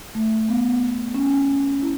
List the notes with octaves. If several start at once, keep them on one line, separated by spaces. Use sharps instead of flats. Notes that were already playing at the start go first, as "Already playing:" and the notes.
A3
B3
C#4
E4